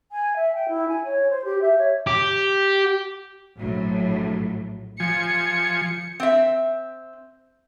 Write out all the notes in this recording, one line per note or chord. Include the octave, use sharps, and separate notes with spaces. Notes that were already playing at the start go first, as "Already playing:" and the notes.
G#5
E5
G5
E4
G#5
C#5
C5
G4
E5
C#5
G4
A#1 A2 F#3
F3 G#5 C#7
C4 E5